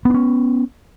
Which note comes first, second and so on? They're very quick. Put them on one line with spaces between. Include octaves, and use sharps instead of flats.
B3 D4 C#4